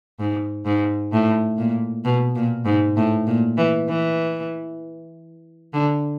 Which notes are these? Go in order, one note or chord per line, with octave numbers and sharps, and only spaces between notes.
G#2
G#2
A2
A#2
B2
A#2
G#2
A2
A#2
E3
E3
D3